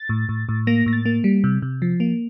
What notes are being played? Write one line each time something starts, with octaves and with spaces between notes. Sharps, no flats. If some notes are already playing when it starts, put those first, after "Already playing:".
Already playing: A6
A2
A2
A2
A#3 A#6
A2 A#6
A6
A#3
G3
C3
C3
F3
A#3